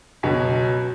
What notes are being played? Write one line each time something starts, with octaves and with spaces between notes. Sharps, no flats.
C#2 B2 F#3